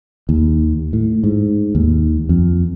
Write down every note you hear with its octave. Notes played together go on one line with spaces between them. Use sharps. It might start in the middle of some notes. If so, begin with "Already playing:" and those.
D#2
A2
G#2
D#2
F2